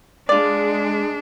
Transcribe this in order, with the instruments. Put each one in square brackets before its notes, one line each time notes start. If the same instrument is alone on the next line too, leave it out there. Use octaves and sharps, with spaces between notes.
[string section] G#3 [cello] D4 [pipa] F4 D5